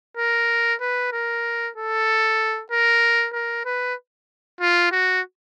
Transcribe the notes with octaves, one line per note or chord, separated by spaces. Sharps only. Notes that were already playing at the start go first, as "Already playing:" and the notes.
A#4
B4
A#4
A4
A#4
A#4
B4
F4
F#4